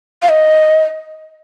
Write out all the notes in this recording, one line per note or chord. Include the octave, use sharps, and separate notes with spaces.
F5
D#5